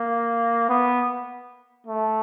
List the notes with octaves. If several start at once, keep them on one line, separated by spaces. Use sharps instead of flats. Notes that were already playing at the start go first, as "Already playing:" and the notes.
Already playing: A#3
B3
A3